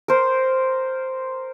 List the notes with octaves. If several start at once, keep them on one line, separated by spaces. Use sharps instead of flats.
A#4 C5